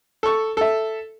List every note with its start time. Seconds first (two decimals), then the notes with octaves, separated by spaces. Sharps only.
0.23 A4 C#6
0.57 A4 E5